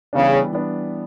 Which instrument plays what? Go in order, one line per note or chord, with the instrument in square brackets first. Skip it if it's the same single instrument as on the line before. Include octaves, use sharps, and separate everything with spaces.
[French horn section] C#3 [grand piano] E3 G3 B3 D4
[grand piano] E3 G3 B3 D4